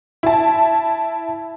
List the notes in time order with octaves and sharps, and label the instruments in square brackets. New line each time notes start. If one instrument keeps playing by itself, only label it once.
[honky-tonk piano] E4 A5